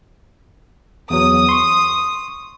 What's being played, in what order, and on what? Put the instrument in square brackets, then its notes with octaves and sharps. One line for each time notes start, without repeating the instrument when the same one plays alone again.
[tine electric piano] E2 F#3 [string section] D#6
[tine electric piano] C6 C#6